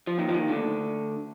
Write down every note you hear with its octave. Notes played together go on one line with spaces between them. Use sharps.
F3
D#2 D#3
F3
D#2 D#3
D2 D3